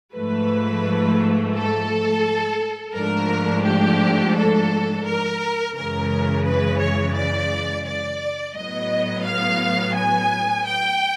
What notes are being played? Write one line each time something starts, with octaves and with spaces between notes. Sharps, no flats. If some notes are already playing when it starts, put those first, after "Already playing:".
G#2 F3 A3 B4
A4
G#2 F3 A3 D4 A#4
G4
A4
A#4
F#2 C#3 E3 G#3 A#4
B4
C#5
D5
D5
A2 F#3 B3 D#5
F5
G#5
G5